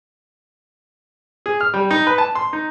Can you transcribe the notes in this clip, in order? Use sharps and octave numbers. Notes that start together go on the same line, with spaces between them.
G#4
F6
G3
D#4
B4
A5
C6
D#4